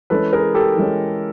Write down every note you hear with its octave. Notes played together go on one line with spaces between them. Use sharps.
E3 G#3 C#4 A4 B4
G#4 A#4
G4 A4
E3 G#3 C#4